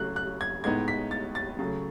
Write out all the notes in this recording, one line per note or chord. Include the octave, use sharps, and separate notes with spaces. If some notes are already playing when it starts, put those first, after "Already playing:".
Already playing: C#3 F#3 A3 F#6
F#6
G#6
A2 G#3 B3 D#4 G#6
B6
A6
A6
C#3 F#3 A3